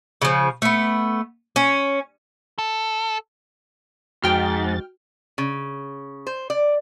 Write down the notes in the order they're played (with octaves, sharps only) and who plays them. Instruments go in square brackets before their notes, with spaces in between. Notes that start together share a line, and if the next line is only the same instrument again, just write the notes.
[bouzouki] C#3 F3
A3 B3
C#4
[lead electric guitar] A4
[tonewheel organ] F2 A6 [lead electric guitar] G#2 [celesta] F#4 G7 [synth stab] G5 F6
[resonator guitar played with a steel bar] C#3
C5
D5